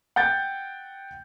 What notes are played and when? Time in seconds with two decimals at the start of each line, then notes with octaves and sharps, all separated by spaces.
0.16 F#5 G5 G6 A6